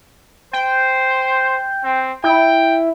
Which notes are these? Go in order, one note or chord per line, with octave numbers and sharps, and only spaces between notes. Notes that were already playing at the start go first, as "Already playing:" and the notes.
C5 G5
C4
E4 G5